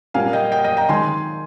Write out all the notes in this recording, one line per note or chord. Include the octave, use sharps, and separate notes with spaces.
A#2 G3 A#3 F5 G#5
D#5 G5
D#5 G5
D#5 G5
G5 A#5
D#3 G#3 G#5 C6